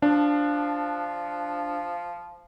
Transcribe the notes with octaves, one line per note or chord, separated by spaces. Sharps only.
F3 D4